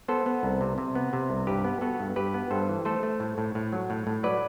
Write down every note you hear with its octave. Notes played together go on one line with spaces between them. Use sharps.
B3 A4 C5
B3
C2
C3
C3
B3
C3
C2
G2 G4 B4
B3
B3 F#4 A4
G2
G2 G4 B4
B3
G2 A4 C5
E3
A3 A4 C5
A3
A2
A2
A2
F#3
A2
A2
F#3 B4 D5